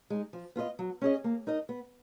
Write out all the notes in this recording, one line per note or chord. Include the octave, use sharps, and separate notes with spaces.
G#3 D#4
F3
B3 F4 B4 D#5
F#3
C#4 G#4 D#5
A#3
D#4 A#4 D#5
B3